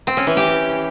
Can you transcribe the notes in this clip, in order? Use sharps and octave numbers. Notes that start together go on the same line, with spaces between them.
C4
C#4
E3
G4